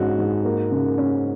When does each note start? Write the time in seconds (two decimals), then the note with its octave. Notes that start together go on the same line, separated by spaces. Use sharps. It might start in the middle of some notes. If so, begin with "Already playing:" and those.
Already playing: G#2 C#4 F#4
0.18 G#2
0.45 A#3
0.71 C#3
0.98 C#4